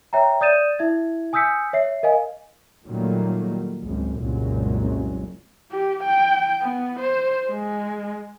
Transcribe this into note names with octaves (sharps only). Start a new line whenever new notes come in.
C#5 E5 G5 A#5
D5 D#6 G6 A6 D#7 E7
E4 E5 G#6
G#5 D#6 E6 G6 B6 C#7
C#5 E5 C7
A#4 D#5 F5 G#5
A#2 D#3 F#3 G3 A3 A#3
G#1 C#2 F#2
F#1 C2 F#2 A#2 F#3 G#3
G4
G5
B3
C5
G#3